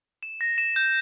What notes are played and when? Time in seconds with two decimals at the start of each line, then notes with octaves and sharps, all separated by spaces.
0.23 E7
0.41 A#6
0.58 E7
0.76 G6